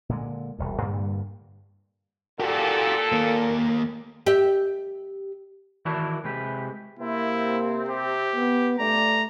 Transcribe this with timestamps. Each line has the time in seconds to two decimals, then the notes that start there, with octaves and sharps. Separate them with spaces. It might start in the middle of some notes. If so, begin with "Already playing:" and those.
0.09 A#2 D3 G#3
0.59 E1 C2 F2
0.82 G2 A#2 D3 G3
2.40 A#2 F#4 G4 A4
3.12 D#2 A#3
4.26 G4 E5
5.85 D#3 E3 E4 F#4 D5 A5
6.24 C3 G#3 G4 B4
6.99 C3 A#3 C4 E4
7.89 G4
8.35 B3
8.79 G2 A3 D4 D5 A#5